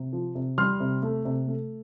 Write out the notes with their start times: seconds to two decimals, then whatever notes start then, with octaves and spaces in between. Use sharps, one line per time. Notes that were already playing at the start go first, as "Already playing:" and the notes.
Already playing: C3
0.13 F3
0.35 C3
0.58 G3 C6 F6
0.80 C3
1.02 A3
1.25 C3
1.48 A3